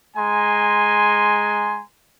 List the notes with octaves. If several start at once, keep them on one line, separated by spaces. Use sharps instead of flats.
G#3 G#5 A#5 C6